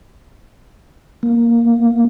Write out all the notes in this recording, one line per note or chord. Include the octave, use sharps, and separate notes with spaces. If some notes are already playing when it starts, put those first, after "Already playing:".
A#3